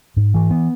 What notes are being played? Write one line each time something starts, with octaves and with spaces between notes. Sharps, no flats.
G#2
E3
B3